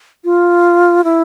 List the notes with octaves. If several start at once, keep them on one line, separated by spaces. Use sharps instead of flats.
F4
E4